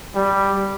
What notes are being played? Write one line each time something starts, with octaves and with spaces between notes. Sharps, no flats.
G3